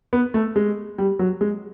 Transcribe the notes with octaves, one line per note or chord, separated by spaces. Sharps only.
B3
A3
G#3
G3
F#3
G#3